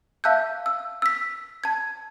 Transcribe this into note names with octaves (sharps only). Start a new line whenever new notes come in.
E5 F5 A5 E6 F#6 G6
E6
E6 B6
A5 G#6